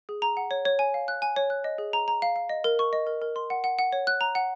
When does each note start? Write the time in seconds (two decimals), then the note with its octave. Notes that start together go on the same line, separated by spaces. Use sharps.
0.09 G#4
0.22 A#5
0.37 F#5
0.51 C#5
0.65 C#5
0.79 G#5
0.94 F5
1.08 F#6
1.22 G#5
1.36 C#5
1.50 F#6
1.64 D#5
1.78 G#4
1.93 A#5
2.08 A#5
2.22 F5
2.36 F5
2.49 D#5
2.64 A#4
2.79 C#6
2.93 D#5
3.07 A#4
3.22 A#4
3.36 C6
3.50 F#5
3.64 F#5
3.79 F#5
3.93 C#5
4.07 F#6
4.21 A#5
4.35 F#5